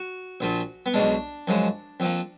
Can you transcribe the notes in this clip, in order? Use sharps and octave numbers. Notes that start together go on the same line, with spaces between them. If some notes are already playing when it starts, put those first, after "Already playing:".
Already playing: F#4
A#1 A#2 F3
B3
B1 B2 G#3 D4
F#2 F3 G#3
F2 F3 A#3